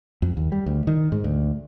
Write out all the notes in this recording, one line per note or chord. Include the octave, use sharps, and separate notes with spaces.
F2
D#2
G3
D2
D#3
G#2
D2